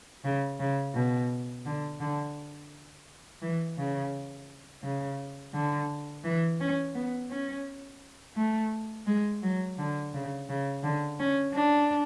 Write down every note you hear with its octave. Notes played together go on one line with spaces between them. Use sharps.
C#3
C#3
B2
D3
D3
E3
C#3
C#3
D3
E3
C#4
B3
C#4
A3
G#3
F#3
D3
C#3
C#3
D3
C#4
D4